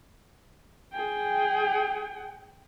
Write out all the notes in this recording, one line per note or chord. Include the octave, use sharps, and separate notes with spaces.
G#4 G5